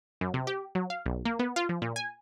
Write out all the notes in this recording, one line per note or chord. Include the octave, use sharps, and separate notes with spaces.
F#2
C3
G4
F#3
F5
B1
A#3
B3
F4
F3
A#2
G#5